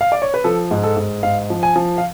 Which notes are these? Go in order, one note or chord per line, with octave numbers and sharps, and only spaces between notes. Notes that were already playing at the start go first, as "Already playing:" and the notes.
F5
D5
C#5
B4
F3 A4
G#2
A4
G#2
G#2 F5
F3
G#5
F3
F5